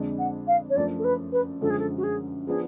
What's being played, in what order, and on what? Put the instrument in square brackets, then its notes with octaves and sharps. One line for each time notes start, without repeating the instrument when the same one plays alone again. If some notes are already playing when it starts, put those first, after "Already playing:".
Already playing: [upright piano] F2 D3 G#3 D4
[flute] F#5
F5
C#5
[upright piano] F#2 F3 A3 D4 [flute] D5
[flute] A4
B4
B4
[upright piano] F#2 D3 F3 G#3 [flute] A4
[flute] G#4
A4
F#4
G#4
[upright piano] F3 B3 D4 [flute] G#4